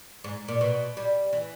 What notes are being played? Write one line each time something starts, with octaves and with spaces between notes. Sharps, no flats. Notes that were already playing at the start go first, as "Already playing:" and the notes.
G#2
A#2
B2
G3
E3